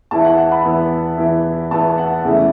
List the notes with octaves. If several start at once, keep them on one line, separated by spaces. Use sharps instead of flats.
E2 E3 B3 E4 A5
F#5
F#5
B5
E2 E3 B3 E4
E2 E3 B3 E4
E2 E3 B3 E4 A5
F#5
E2 C#3 E3 A3 E4